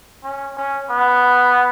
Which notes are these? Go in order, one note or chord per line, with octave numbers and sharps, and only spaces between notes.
C#4
C#4
B3